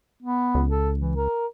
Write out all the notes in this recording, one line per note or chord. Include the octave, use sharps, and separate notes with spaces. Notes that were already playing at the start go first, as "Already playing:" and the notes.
B3
C#2
A4
E3
A#4